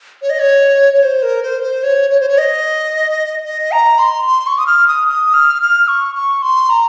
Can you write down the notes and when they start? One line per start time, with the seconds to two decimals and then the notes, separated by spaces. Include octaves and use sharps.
0.22 C#5
0.30 D#5
0.39 C#5
0.94 C#5
1.03 C5
1.23 A#4
1.43 C5
1.63 C5
1.83 C#5
2.10 C#5
2.21 C5
2.29 C#5
2.38 D#5
3.45 D#5
3.72 A#5
3.99 C6
4.27 C6
4.47 C#6
4.58 D#6
4.67 F6
4.87 D#6
5.08 D#6
5.34 F6
5.62 F6
5.88 C#6
6.15 C#6
6.42 C6
6.70 A#5